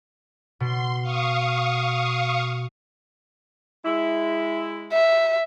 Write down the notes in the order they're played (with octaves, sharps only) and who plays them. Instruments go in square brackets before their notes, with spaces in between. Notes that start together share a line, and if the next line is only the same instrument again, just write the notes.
[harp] B2 [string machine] C6
[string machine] F5 C#6 D#6
[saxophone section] G#3 E4
[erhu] E5